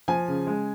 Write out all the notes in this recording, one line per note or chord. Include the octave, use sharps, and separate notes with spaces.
F3 G#5
C#3
G#3